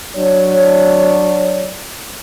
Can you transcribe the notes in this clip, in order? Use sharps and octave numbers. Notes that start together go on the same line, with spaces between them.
F#3 D4 C#5